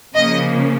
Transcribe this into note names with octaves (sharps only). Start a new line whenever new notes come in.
C#3 F3 A#3 D#5